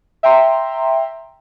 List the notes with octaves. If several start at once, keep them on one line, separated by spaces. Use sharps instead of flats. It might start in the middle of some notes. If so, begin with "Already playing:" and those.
E5 G5 A#5 C6